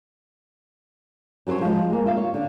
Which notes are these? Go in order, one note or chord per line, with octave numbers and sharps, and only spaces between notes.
F#2 F#3 A4 C5 C#5
F3 G#3
G#3 A#3
F4 E5 F5
C#5
D3